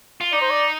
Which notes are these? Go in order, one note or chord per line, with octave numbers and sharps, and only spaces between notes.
F4
D#4 D5
C5
D5